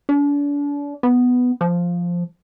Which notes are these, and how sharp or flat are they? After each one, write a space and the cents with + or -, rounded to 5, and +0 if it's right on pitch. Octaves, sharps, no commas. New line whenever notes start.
D4 -40
B3 +5
F3 +0